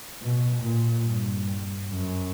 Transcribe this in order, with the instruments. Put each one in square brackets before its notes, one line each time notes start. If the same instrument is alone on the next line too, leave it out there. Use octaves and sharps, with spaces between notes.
[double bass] B2
A#2
G2
F#2